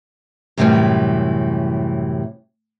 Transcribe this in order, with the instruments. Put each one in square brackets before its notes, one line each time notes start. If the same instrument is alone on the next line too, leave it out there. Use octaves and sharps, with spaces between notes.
[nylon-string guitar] F#2 A2 C3 D#3 E3 G3